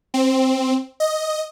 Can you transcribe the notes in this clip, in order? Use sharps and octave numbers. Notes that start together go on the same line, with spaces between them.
C4
D#5